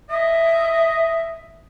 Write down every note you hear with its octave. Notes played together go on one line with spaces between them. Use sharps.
D#5 E5